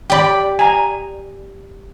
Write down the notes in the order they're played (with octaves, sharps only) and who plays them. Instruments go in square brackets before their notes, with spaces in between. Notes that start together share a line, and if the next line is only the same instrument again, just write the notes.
[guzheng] G4 D5 [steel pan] G5 B5
[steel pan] G#5 A#5